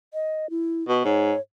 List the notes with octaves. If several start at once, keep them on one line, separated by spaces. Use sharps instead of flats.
D#5
E4
B2
G#2 C#5